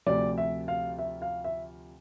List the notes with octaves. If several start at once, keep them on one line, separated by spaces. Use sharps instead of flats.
D2 C3 F3 D5
E5
F5
E5
F5
E5